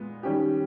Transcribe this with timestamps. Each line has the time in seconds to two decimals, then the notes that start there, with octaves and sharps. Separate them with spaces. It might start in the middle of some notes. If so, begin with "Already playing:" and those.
Already playing: A#2 G#3 B3
0.23 D#3 G3 C#4 G4